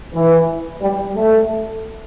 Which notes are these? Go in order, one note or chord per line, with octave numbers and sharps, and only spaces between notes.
E3
G3
A3